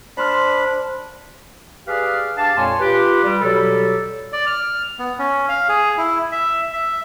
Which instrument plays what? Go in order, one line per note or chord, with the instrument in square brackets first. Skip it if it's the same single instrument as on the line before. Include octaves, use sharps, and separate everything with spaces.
[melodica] D4 B5 [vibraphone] C5 [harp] A5 C6 F6
[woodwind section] G4 G#4 B4 D5 F5
D4 G4 F5 A5
F2 A#2 G#3 C#5 G#5 C6
F4 G4 B4
G3
B2 F#3 G3 G4 A4
[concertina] D5
F6
B3
C#4
F5
G#4
E4
E5
E5